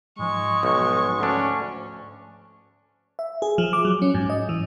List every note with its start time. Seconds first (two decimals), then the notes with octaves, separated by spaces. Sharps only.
0.19 G#2 F3 G#3 C#6
0.63 B1
1.20 D2 C#4 D4
3.19 E5
3.42 G#4
3.58 F3
3.73 D6
3.85 F#3
4.02 C#4
4.14 G#2
4.30 D#5
4.49 E3